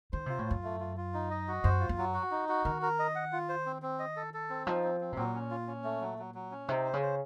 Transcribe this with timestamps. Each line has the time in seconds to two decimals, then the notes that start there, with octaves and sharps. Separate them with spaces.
0.13 D#3 C5
0.26 C3 F4
0.39 A2
0.46 F#2 F4
0.64 A3
0.80 F4
0.97 F4
1.14 D#4
1.31 D#5
1.48 F#4
1.64 F#2 C5
1.80 F4
1.89 F#2
1.98 F#3
2.14 F#4
2.31 D#4
2.49 F#4
2.65 D#3 A#4
2.82 A#4
2.99 D#5
3.15 F#5
3.32 F4
3.49 C5
3.66 C4
3.82 C4
3.99 D#5
4.16 A4
4.34 A4
4.50 C4
4.67 F3 D#4
4.84 C4
5.01 C4
5.12 C3
5.17 A#2 F#3
5.34 C#4
5.51 F4
5.67 C#4
5.84 A3
6.01 F#3
6.18 F#3
6.35 F#3
6.51 C#4
6.68 C3 D#4
6.85 C5
6.93 C#3
7.02 C5